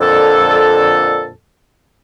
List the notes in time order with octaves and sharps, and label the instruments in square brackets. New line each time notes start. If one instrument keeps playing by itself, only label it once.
[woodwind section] F2 A#2 D3 A4